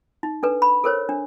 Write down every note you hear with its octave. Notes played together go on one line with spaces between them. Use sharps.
D#4
D4 A4 B4
B5
A4 A#4 C5 C#5
D4